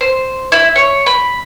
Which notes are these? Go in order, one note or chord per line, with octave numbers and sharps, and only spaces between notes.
C5
E4
C#5
B5